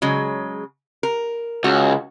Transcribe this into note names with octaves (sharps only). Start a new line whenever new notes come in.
C#3 F#3 G#3
A#4
C#2 F#4